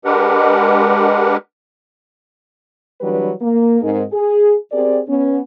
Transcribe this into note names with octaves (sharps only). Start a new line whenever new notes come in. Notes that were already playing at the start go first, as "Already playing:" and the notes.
G#3 D4 G4 A#4 B4 F#5
E3 F#3 G3 D4 G4 B4
A#3
G#2 G#3 C4 D#4 G#4 A#4
G#4
C4 G4 G#4 A#4 D5
B3 C#4